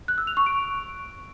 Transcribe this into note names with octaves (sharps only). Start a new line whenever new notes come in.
F#6
E6
F7
C#6
D7